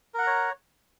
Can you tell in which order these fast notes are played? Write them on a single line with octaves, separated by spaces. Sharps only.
A#4 F#5 A#5 C#5